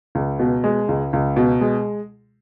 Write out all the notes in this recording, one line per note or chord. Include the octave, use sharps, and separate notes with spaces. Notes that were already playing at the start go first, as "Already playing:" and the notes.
C#2
B2
G#3
C#2
C#2
B2
G#3